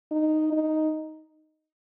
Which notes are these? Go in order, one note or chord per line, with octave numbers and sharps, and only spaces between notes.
D#4
D#4